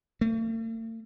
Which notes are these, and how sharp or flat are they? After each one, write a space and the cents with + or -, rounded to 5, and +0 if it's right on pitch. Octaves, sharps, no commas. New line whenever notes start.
A3 +45